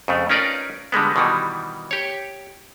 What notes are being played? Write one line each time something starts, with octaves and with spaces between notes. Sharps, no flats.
F2 C#3 A3
C#4 D#4 F4 A#4 B4 D5
D3 G3 G#3 B3
B2 D#3 E3 G3
G4 C#5